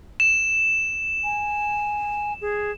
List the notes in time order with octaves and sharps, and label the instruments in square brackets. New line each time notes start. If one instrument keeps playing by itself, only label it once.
[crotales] E7
[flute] G#5
G#4